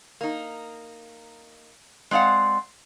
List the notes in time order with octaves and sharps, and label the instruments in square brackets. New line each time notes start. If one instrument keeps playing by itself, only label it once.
[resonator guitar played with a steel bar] A#3 D#4
G#3 C4 D5 F5 F#5